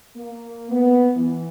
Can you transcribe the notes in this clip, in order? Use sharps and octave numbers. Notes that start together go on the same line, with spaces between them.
A#3
B3
E3